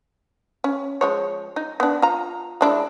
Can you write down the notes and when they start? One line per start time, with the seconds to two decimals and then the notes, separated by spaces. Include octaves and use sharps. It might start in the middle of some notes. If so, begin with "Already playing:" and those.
0.64 C#4
1.01 F3 G#3 C#5
1.56 D#4
1.80 B3 D4
2.02 F4 A#5
2.61 G#3 D4 E4